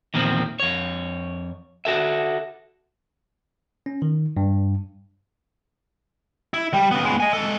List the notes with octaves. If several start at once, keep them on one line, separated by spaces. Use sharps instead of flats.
E2 A#2 D#3 F3 C4
F2 C#5
F#4 A4 E5
C#4
D#3
G2
E4
G3
C#3 B3
G#3 B3
D#5 G#5
G#3 A4